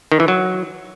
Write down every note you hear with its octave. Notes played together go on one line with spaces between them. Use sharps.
D#3
E3
F#3